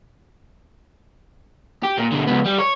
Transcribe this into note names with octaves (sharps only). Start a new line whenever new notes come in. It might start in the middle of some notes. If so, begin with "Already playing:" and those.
G4
A#2
B2 D3
C#2 B3
G3
C#5